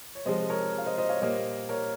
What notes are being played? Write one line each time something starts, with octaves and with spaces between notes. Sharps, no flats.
C#5
C3 F3 G#3 C5 D#5
A#4 C#5
F5
C5 D#5
C5 D#5
C#5 F5
A#2 G3 A#3 C5 D#5
A#4 C#5